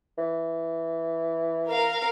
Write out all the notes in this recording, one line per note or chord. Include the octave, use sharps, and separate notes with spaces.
E3
A#4 F5